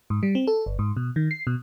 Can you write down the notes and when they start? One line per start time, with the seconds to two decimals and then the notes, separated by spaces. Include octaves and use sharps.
0.10 G#2
0.23 G3
0.35 C4
0.47 A4
0.66 G1
0.79 G#2
0.97 B2
1.16 D#3
1.31 C7
1.47 B2